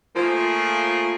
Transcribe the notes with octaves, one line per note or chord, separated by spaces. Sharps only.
F3 A3 A#3 F4 G#4